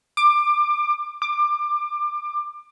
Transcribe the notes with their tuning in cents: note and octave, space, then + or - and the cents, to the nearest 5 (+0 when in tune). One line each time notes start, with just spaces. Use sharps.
D6 +20
D6 +20